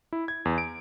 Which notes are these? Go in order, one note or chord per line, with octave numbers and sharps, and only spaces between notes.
E4
G#6
E2
D7